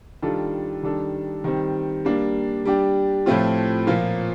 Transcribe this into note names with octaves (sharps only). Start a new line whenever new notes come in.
D#3 G3 D4 F4 A4
D#3 G3 D4 A4
D#3 G3 C4
G3 A#3 D4
G3 D4 G4
A2 F3 A3 C4 F4
A#2 F3 A#3 F4